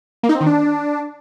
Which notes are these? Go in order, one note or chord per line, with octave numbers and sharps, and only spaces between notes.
A#3
D#4
C4
D#3
D4